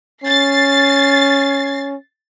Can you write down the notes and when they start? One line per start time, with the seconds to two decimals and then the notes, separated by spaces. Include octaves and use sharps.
0.24 C#4 A6 C7